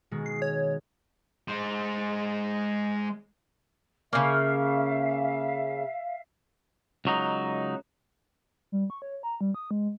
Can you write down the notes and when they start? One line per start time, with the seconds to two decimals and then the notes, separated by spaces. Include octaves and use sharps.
0.11 B2 D#3 G#3
0.26 C7
0.42 C#5
1.48 G#3 C5
4.13 C#3 A#3 E5 F5
7.05 C#2 F#3 D#4
8.72 G3
8.90 C#6
9.02 C#5
9.23 A#5
9.41 G3
9.54 D#6
9.71 G#3